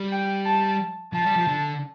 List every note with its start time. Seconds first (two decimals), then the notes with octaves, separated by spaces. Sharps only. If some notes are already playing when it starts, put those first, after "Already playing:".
Already playing: G3
0.12 G5
0.46 A5
1.13 F3 A5
1.25 G3
1.36 F3
1.48 D3